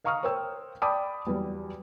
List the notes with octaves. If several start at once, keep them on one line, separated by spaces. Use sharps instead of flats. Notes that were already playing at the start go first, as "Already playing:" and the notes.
D#5 F5 A#5 C#6 D#6 F6
A#4 C5 C#5 G5 E6
D5 G5 A5 B5 D6 D#6
E2 F#3 G3